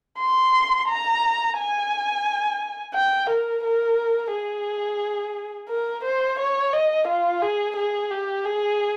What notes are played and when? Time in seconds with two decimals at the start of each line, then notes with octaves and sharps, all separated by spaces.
0.20 C6
0.89 A#5
1.58 G#5
2.95 G5
3.30 A#4
3.64 A#4
4.32 G#4
5.70 A#4
6.04 C5
6.39 C#5
6.73 D#5
7.08 F4
7.42 G#4
7.76 G#4
8.11 G4
8.45 G#4